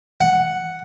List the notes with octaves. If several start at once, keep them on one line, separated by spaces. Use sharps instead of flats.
F#5